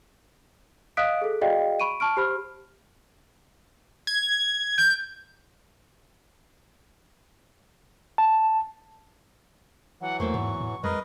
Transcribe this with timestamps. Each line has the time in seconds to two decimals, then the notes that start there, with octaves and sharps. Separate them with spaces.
0.97 D#5 F5 D#6 F#6 B6 D7
1.21 G#4 A4
1.41 F#4 G#4 D5 D#5 F5 G5
1.80 B5 C#6 D7 D#7
2.00 A5 C#6 F6 D7
2.17 G4 C5 B5 F6
4.07 G#6
4.78 G6
8.18 A5
10.01 E3 F#3 F#5
10.20 E2 A3 A#3 C5 C#6
10.34 E2 G#2
10.60 A2
10.84 F2 G#3 A#4 B4 D#5